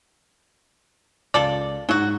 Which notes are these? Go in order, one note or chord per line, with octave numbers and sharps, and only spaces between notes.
C#2 F4 A4 D5
G#2 F#3 F#4